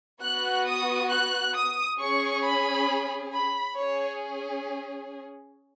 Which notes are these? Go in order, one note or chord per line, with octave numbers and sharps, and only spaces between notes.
B3 F#4 F#6
D#6
F#6
D#6
C#4 G#4 C#6
B5
B5
C#4 G#4 C#5